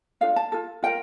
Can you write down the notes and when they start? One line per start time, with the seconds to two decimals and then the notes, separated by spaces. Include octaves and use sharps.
0.21 D4 F4 A4 F5
0.36 A5
0.52 F4 A4
0.83 F4 A#4 G5